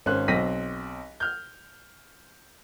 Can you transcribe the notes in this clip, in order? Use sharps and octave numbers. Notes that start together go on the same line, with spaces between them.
G#1 C#4 C5 F#6
B1 C4 A#6 B6 D#7
F6 G6